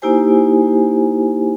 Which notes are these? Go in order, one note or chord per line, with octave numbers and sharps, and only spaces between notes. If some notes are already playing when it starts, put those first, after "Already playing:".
A#3 D#4 E4 G4 C5 G#5